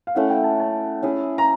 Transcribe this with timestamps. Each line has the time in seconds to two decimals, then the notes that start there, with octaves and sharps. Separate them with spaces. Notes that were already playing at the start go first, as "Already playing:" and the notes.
0.07 F5
0.15 A3 C#4 E4 F#5
0.30 G5
0.44 A5
0.60 A5
1.03 C#4 E4 G#4
1.38 A#5